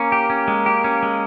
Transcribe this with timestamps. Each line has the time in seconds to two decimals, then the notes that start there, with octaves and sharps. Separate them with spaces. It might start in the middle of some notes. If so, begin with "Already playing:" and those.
Already playing: A#3 C#4
0.12 G4
0.30 C#4
0.48 G#3
0.66 G4
0.84 C#4
1.03 G#3